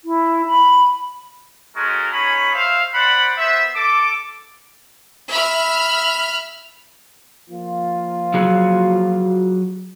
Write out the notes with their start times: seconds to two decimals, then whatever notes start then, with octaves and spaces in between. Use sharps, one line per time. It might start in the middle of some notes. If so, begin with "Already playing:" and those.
0.05 E4
0.47 B5
1.75 G#3 C#4 F#4 A4 A#4
2.13 C#4 D#4 G#4 C#5 B5
2.53 C5 E5 F5
2.94 C5 D5 F#5 B5
3.37 B3 C5 E5
3.75 A4 D6
5.28 E5 B5 F6
7.49 F3 A#3 F4
8.34 F#3 F#4 G#4